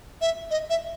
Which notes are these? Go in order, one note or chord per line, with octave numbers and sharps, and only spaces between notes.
E5
D#5
E5